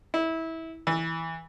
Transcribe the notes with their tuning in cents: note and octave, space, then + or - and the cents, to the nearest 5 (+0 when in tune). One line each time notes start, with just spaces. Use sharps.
E4 -20
E3 -10